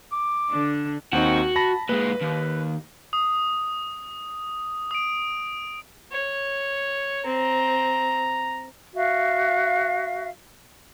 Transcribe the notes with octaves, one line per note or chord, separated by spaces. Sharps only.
D6
D3 D4
D#2 C4 D#4 F#4
A5 B5 A#6
A#2 G#3 B4
D#2
D#6
D#6 D7
C#5
C4 A#5
F#4 E5 F5